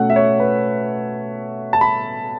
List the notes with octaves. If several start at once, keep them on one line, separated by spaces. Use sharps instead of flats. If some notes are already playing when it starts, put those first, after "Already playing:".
Already playing: B2 A3 C#4 F#5
E5
C#5
B4
A5
B5